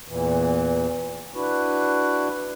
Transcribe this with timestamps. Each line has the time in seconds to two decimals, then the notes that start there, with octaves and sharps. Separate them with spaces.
0.08 E2 A#2 E3
1.35 D4 E4 F#4 B4